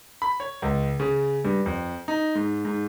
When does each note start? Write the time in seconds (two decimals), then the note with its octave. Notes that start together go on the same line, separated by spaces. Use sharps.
0.22 B5
0.40 C#5
0.62 C#2
1.00 C#3
1.44 G2
1.66 F2
2.08 D#4
2.35 G#2
2.65 G#2